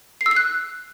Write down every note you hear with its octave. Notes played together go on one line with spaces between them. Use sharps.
C7
E6
C7
F#6